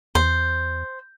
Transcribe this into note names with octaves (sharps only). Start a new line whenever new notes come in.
E2 C5